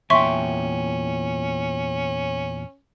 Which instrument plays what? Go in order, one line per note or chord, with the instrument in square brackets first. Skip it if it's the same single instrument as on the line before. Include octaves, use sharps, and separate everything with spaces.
[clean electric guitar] E2 A#2 G5 [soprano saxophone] C#4 [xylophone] E5 C6 C#6